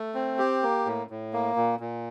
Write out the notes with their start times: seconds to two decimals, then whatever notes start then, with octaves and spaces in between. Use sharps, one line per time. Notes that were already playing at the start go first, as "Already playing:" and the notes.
Already playing: A3
0.14 C4
0.39 G4
0.63 A#3
0.85 A2
1.10 A2
1.33 A#3
1.56 A#2
1.80 A#2